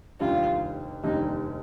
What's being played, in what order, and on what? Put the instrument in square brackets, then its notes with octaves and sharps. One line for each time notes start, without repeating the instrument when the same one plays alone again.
[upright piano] F1 D#2 D#3 G3 D4 [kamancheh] F4
[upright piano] F1 D#2 D#3 G3 D4 [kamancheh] D#4